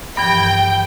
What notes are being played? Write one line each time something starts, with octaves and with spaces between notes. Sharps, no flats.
G2 E3 F3 G5